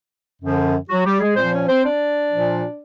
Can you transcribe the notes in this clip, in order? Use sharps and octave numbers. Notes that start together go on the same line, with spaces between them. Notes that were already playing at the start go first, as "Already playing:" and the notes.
F#2 D3 F3
F#3 F#4
G3 G4
G#3 G#4
A#2 F3 C4 C5
C#4 C#5
C4 C5
D4 D5
A#2 F3